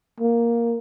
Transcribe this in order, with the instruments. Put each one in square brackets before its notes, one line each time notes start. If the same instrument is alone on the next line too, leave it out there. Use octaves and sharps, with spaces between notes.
[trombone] A#3